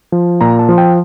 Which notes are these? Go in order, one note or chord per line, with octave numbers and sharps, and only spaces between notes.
F3
A#2 A#5
A5
F3
G5